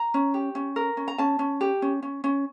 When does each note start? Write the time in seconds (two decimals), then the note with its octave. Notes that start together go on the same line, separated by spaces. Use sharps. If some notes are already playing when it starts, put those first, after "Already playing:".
Already playing: A#5
0.14 C#4
0.34 G4
0.55 C#4
0.76 A#4
0.97 C#4
1.08 A#5
1.18 C#4 A5
1.39 C#4
1.61 G4
1.82 C#4
2.02 C#4
2.24 C#4